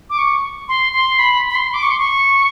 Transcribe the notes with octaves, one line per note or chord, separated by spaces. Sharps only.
D6
C#6
C6
C6
B5
B5
C6
D6
C#6
C6
C#6